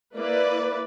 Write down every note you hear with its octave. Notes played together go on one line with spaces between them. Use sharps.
A#3 E4 B4 D5